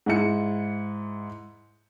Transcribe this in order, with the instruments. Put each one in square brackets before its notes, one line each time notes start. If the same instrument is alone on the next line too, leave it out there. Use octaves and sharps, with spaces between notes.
[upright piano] G#2 E4 C#7